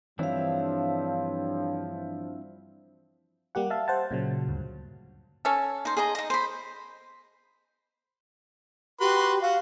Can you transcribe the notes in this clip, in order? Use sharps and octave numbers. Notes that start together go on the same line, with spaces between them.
G2 E3 F3 C4 D4 E4 C#5 F5
G3 A#3 G4 F#5
E5 F5 A5
C5 F#5 A5
A#2 C#3 F#3
D2 G2
C#4 A4
D#4 C5
G#4 D#5 A#5
D#4 D#5
C5 B5
F#4 G4 B4 C6
F#4 F5